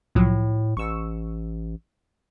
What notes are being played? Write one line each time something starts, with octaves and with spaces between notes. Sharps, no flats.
C2 A2 F3 F#3
A1 C#6 E6